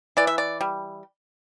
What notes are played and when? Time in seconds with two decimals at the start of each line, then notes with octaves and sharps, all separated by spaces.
0.17 E3 D5
0.27 E5
0.38 D5
0.61 G3